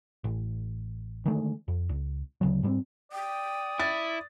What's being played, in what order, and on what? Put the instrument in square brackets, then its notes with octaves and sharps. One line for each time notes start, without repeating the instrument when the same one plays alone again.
[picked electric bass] A1
D3 D#3 G#3 A3
F2
C#2
D2 C#3 F#3
G#2 G3 A3 C4
[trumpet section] D5 D#6 [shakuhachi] G5
[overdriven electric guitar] E4 [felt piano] A6